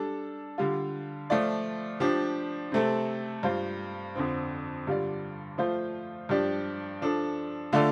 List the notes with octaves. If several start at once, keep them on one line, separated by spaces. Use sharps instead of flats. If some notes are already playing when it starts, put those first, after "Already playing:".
Already playing: G3 D4 A4
D3 G3 F4
F3 A3 F4 D5
F3 D4 G4
C3 A3 C4 A4
G2 G3 F4 C5
F2 D3 F3 C4
G2 D3 G3 F4 D5
F3 A3 F4 C5
G2 F3 D4 G4 D5
F3 D4 A4
D3 A3 F4 A4 D5